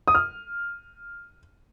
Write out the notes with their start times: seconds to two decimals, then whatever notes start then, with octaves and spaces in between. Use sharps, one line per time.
0.08 D#6
0.15 F6